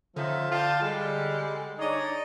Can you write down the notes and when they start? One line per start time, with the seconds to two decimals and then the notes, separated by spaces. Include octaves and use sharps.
0.16 D3 F3 C#4 D#4 E5
0.52 F4 D5 G5 A5
0.82 G3 G#3
1.78 D4 D#4 G#4 C#5 D5